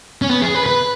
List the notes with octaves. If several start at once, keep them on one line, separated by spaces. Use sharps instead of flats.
C#4
B3
G#4
B4
B4